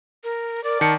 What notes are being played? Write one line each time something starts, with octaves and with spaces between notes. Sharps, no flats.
A#4
A#4 D5
D#3 A5 C#7